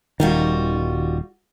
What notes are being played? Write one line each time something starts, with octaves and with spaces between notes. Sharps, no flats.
D#1 D#3 G3 F4 F#4